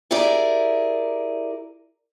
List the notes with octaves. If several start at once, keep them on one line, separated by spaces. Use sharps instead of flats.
E4 G4 G#4 A#4 D5